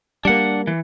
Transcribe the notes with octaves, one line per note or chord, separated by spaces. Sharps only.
G3 A#3 D4 F#5
E3